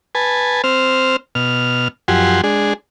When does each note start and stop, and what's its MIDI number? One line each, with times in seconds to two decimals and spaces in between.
0.15 0.62 71
0.15 0.62 80
0.15 0.62 81
0.64 1.16 60
0.64 1.16 72
0.64 1.16 89
1.35 1.88 47
1.35 1.88 89
2.08 2.41 42
2.08 2.41 53
2.08 2.41 67
2.08 2.41 78
2.08 2.41 80
2.08 2.41 84
2.44 2.73 56
2.44 2.73 62
2.44 2.73 68